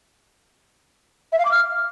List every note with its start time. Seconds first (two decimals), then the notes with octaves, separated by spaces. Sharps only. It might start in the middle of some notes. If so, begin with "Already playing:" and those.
1.32 E5
1.39 F5
1.45 D6
1.51 F6